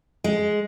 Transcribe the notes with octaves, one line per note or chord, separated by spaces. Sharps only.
G#3